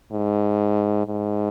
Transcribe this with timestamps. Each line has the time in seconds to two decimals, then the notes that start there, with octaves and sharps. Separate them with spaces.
0.12 G#2
1.07 G#2